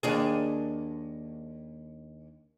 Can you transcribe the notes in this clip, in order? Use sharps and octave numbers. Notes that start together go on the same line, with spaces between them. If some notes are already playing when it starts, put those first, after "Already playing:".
D#2 D4 G#4